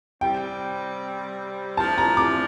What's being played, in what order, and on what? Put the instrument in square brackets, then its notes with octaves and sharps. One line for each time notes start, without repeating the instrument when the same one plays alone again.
[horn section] C3 G3 C4 [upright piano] G5
[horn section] F3 A3 D4 F4 [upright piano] A5
[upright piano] A#5
D6